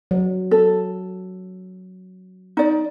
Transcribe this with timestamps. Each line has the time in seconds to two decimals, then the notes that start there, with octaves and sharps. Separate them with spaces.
0.11 F#3
0.51 A4
2.57 D#4 D5